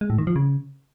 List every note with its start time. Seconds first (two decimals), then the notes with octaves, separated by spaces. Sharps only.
0.01 G#3
0.10 A2
0.18 D#3
0.27 F3
0.36 C#3